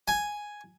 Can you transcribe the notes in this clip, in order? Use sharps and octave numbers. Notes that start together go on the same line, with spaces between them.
G#5